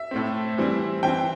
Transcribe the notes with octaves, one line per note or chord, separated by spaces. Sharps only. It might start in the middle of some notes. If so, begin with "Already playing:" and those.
Already playing: E5
A2 A3 C4
E3 G3 C4 E4
E3 C4 E4 G5